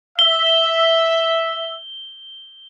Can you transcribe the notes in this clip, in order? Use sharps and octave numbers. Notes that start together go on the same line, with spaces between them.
E5 G7